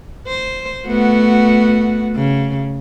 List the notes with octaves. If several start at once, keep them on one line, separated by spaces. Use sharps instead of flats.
C5
A3 B3 F#4
C#3